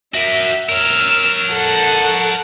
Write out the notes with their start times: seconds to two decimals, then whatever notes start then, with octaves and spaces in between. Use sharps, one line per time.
0.14 F#4 A#4 E5
0.69 A#4 C#5 E6 F6
1.51 A4 F#5